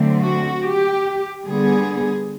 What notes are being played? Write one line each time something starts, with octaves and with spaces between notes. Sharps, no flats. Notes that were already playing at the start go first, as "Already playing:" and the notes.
Already playing: D3 F#3 A3 C4
F#4
G4
D3 G3 B3 G#4